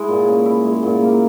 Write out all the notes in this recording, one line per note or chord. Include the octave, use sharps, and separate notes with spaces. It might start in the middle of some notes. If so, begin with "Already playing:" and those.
Already playing: G#3 E4
A#2
C#4
E4
G#3
A#2
A#3